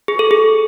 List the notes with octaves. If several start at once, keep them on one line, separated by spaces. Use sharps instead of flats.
G#4
A4
G#4